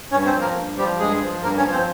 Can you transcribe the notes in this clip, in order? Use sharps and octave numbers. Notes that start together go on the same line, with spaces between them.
G2 C#4 C#5
C4 C5
F3
A#3 A#4
G2
F3 G3 G4
G2 G#3 G#4
F3
G2 A#3 A#4
C#4 C#5
F3
C4 C5